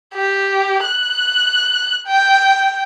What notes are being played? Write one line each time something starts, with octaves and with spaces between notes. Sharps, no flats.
G4
F#6
G5